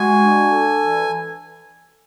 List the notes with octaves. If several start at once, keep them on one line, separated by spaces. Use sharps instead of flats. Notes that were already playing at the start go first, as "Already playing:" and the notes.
Already playing: G#3 F#4 G#5
D4
A4
E3